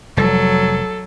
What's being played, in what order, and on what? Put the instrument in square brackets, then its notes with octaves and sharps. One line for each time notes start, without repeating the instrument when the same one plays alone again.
[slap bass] F1 G3 [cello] F#3 [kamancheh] A4